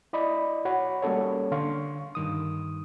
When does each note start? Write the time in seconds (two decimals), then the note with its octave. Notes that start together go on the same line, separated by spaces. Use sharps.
0.13 E4 D5 D#5 B5
0.65 F#4 C#5 F#5 B5
1.02 G3 A#3 C#4 A4 C#5
1.52 D3 F5 C6 C#6
2.15 G2 D#3 D#6